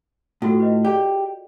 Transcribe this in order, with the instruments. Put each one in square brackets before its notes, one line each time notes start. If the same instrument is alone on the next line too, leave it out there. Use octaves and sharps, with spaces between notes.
[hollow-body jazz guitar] A2 [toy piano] F4 F#4 A4
[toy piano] B4 D#5
[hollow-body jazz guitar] G4 [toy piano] G#4 D5